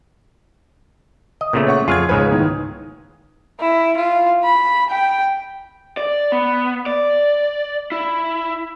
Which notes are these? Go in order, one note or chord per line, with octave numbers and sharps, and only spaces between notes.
D#5
A#2 C#3 A3 B3
C#5 F#5 C#6
F2 F4 G#4 C#6 F6 G#6
C#2 G#2 B4 C#5 G#5 D#6
A2 D#3
E4
F4
B5
G5
D5
B3
D5
E4